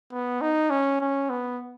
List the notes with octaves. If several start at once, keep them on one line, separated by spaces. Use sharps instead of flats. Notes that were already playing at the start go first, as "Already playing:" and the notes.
B3
D#4
C#4
C#4
B3